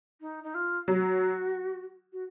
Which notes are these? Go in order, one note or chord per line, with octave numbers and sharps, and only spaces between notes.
D#4
D#4
F4
F#3 F#4
F#4